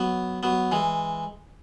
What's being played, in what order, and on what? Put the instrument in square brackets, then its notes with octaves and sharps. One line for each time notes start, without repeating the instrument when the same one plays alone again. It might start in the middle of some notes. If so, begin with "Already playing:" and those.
Already playing: [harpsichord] F#3 B3
F#3 B3
E3 G#3